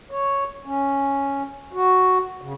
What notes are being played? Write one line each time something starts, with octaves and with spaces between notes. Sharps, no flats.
C#5
C#4
F#4
C#3